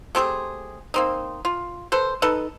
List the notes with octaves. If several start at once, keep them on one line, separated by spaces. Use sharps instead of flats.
A3 C4 G4 G#4
A#3 C4 D#4
F4
A4 B4 C5
D#4 A4 B4